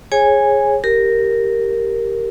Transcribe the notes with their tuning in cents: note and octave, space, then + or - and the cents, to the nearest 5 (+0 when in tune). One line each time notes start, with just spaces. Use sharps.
G#4 +0 C#5 -25 G#5 -10
G4 +0 A#4 -5